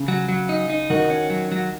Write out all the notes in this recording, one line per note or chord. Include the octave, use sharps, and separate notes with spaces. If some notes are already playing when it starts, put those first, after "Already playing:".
Already playing: C#3
F#3
F#3
D#4
D#4
D#3 F#4
C#4
F#3
F#3